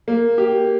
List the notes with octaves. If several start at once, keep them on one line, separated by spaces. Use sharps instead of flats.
A#3
G4